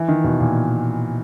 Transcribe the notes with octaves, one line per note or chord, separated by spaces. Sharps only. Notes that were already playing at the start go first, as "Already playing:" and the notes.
Already playing: E3
D#3
B2
A#2